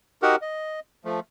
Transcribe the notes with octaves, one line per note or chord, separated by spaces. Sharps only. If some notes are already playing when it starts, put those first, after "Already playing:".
D#4 F#4 G4 A#4 F#5
D#5
F3 A3